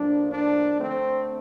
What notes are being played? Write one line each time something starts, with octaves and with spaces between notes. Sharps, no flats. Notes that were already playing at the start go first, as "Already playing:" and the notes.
Already playing: A2 F3 A#3 D4
D4
D3 A3 C4